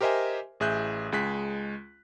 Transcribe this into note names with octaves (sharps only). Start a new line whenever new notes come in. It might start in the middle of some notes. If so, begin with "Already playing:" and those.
G4 A#4 C5 D#5 E5 G#5
A1 G#4 E5 F#6 G6
C#2 G#3 F#6 B6